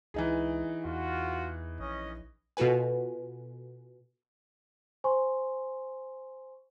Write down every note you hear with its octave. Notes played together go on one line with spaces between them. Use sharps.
C#2 E3 D#4 G#4
E2 F4 F#4
A#1 C#4 D#5
B2 F4 F#4 A4 B4 G#5
C5 G#5 C6 C#6